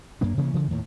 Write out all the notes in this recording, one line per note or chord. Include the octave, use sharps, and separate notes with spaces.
F#2 A#3 D4
C3 E3 A#3 C#4
C#3 E3 F3
D#2 A2 D#3